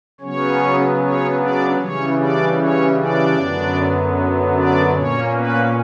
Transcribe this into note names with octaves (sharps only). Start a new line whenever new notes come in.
C#3 F#3 B3 C#4 C#5
C#4 C#5
D4 D5
C#3 E3 G3 C#4 C#5
D4 D5
C#4 C#5
D4 D5
F#2 D3 F#3 B3
D4 D5
A#2 A#3 C#4 C#5
B3 B4